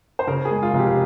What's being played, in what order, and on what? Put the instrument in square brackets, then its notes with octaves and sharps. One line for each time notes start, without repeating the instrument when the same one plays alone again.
[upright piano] C5
C#3 A#4
G#4
G#3
F4
F1
G4